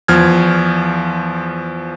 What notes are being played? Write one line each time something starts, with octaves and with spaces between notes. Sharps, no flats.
E2 F3 F6 G#6